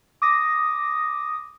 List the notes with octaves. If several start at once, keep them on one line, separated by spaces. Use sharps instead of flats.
D6 D#6 A#6